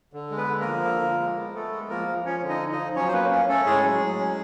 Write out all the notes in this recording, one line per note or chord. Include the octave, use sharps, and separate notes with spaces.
D3
G#3
B3 B4
D3
A#3 A#4
F3
D3
F3
G#3
B3
A3 B3 A4
G#3
F3 A#3 A#4
F3
F3 C#4 C#5
D3
D#4 D#5
F3
D#4 D#5
F3
F#3 C#4 C#5
C5
A#3 B3 B4
C#4
A3 C#4 A4
A2 G#3 G#4
F#3
F#3
C#4